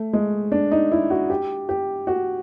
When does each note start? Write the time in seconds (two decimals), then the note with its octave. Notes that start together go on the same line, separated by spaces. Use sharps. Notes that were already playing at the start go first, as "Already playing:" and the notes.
Already playing: A3
0.13 G#3
0.52 D4
0.72 D#4
0.92 E4
1.10 F#4
1.30 G4
1.69 G4
2.07 F#4